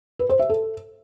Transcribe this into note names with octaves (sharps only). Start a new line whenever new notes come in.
B4
C5
E5
A4